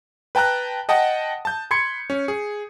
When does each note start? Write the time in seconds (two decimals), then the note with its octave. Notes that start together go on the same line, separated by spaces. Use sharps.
0.35 B4 G5 A5 A#5 F#6
0.89 D#5 F#5 G5 A5 D#6
1.45 A5 G6
1.71 B5 C6 G#6 C#7
2.10 C#4
2.28 G#4